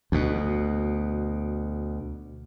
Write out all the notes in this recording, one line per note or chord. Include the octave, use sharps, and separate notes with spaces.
D2 B2